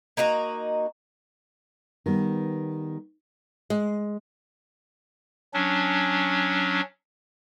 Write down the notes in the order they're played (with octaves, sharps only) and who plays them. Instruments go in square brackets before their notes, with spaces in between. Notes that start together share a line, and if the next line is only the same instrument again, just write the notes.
[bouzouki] A#3 D#4 F#4 A#5
[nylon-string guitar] D#3 G3 B3
G#3
[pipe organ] F#3 C#4 D4